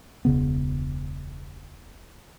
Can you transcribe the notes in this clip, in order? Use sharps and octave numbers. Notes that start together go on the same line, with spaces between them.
E1 C#2 C#3 B3